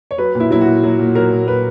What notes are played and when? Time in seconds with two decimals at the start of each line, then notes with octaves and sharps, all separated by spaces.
0.11 C#5
0.18 F#3 B4
0.35 A#2
0.40 E4
0.50 F#3 E4
0.61 F#4
0.67 A#2
0.83 F#3
0.99 A#2
1.15 F#3 A#4
1.32 A#2
1.47 F#3 B4